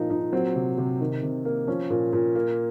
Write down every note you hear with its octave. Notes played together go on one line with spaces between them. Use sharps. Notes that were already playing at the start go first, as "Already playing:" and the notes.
Already playing: A#2 F3 D#4
A#2 D#4
F#3 C4
C3
C3
D#3
C3
A#3
F3 C#4
A#2
A#2
A#3